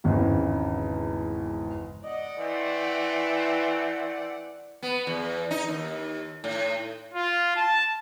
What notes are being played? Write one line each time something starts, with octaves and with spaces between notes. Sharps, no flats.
G#1 E2 C#3
D5 D#5 F#5
E3 A3 C4
B3
E2
D#4
D#2
A2
F4
A5